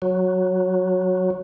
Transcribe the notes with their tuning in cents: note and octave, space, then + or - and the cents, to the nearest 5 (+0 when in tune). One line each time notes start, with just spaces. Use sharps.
F#3 -5